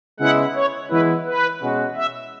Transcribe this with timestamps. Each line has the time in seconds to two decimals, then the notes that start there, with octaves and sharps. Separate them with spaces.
0.19 C#3 G#3 B3 E4 F#5
0.55 C#5
0.90 E3 G#3 B3 E4 B4
1.26 B4
1.61 B2 G#3 C#4 F#4
1.95 E5